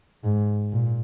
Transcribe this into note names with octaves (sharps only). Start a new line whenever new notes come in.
G#2
A#2